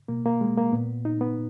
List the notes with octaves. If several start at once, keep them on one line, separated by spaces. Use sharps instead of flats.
B2 A#3
A#3
G#3
A#3
A#2 B3
D#4
B3